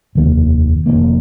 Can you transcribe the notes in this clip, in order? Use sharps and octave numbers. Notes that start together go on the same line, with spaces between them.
F1 D#2 D#3 A#3
F1 D#2 D#3 A#3